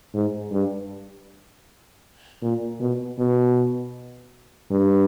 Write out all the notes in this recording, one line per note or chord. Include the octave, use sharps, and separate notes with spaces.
G#2
G2
A#2
B2
B2
G2